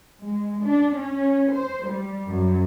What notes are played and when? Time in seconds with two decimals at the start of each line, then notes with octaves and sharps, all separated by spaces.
0.23 G#3
0.65 D4
0.98 C#4
1.52 C5
1.87 G3
2.30 F#2